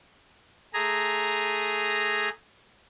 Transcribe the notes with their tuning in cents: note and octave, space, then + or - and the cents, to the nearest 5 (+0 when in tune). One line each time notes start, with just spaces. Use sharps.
A3 +0 G#4 +0 A#5 -5